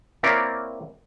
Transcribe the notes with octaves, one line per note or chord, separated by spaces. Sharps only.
A#3 C4 E4 A#4 C#5 D5